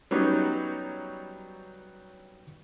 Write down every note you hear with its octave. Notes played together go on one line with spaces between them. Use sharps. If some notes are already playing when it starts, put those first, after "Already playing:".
F#3 G3 B3 C#4 D#4